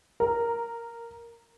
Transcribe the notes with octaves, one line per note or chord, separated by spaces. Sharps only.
A#4